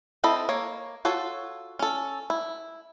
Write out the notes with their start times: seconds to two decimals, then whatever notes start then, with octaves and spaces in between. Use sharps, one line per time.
0.24 C4 E4 A4 D#5 B5
0.49 A#3 C#5
1.05 F4 F#4 A4 C#5
1.79 C#4 A4
2.30 E4